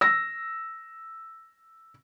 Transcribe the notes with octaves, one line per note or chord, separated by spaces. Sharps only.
E6 A#6